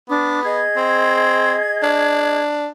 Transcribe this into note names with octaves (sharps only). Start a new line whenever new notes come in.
B3 D4 D6
G#4 D#5 G#6
C4
D4